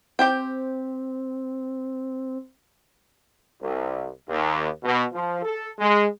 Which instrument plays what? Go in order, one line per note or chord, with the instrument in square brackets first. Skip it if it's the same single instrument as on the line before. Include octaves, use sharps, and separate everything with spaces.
[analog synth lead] C4 [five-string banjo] G4 C5 G5
[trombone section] C2
D#2
B2
F3
A4
G#3